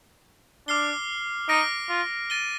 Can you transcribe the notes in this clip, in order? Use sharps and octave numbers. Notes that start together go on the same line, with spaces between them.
D4 D6 F6 C7 G7
D#4 F6 A#6 D7
F4
A6 D#7 G7